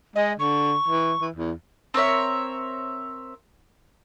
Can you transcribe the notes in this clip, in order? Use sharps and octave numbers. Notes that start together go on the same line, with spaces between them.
G#3 D#5
D3 C#6
E3
E3
E2
C4 A#4 C#5 E5